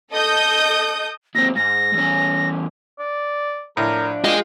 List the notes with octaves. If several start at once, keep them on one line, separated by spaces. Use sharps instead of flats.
A4 D#5 D#6 G6
D#2 C4 A#6
G#2 A#6
E2 C#4
D5
A2 F3 D4 A#4
C3 A#3 D4 F4 G#4 D#5 G5